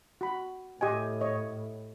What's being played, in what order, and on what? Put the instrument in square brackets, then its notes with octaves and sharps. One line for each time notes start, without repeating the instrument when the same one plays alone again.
[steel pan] F#4 B5
[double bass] A2 [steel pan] G4 D#5 G#5
[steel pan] C#5 D#5